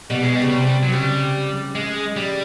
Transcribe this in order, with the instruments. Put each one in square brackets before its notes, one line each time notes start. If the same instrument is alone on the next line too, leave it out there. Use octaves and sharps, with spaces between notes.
[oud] B2 [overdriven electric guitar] G3
[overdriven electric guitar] G#3
G3
[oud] C#3
C3
[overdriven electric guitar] F#3
[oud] C#3 [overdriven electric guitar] G3
[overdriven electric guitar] G#3
G3